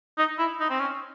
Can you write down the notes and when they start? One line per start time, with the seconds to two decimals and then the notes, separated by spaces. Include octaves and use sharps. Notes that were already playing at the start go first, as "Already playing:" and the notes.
0.18 D#4
0.39 E4
0.60 D#4
0.70 C4
0.79 C#4